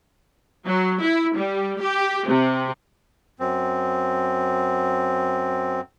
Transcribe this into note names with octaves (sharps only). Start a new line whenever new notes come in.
F#3
E4
G3
G4
C3
F#2 C4